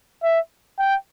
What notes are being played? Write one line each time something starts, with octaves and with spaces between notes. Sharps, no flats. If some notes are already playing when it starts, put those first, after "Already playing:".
E5
G5